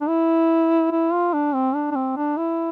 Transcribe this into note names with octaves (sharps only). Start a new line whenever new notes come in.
D4
E4
E4
F4
D4
C4
D4
D4
C4
D4
E4